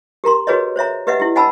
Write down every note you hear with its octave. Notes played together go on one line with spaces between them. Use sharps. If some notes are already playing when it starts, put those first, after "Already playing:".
G4 A#4 A#5 C6
F#4 G#4 B4 C#5 D#5
C5 C#5 E5 A#5
G4 B4 D#5 E5 F#5
E4 G4
D#5 F#5 G#5 A5 B5 E6